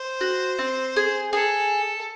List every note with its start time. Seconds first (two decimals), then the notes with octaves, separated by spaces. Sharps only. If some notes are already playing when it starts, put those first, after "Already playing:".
Already playing: C5
0.21 F#4
0.59 C4
0.96 G#4
1.33 G#4 A4